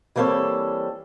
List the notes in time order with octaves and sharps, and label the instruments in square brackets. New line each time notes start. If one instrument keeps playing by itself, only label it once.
[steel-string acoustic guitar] E3 G3 A#3 C4 A4 C#5